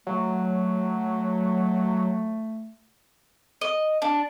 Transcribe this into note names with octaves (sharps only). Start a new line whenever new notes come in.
F#3 A3
D#5
D4